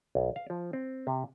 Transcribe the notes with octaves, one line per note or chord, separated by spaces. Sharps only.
B1
F5
F3
C4
C3